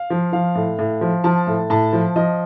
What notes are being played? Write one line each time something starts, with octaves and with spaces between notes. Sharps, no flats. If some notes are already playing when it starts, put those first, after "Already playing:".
Already playing: F5
F3
F3 F5
A2
A2
F3
F3 A5
A2
A2 A5
F3
F3 D#5